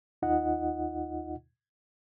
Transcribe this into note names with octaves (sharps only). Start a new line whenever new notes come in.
D#2 D#4 F4 D#5 F#5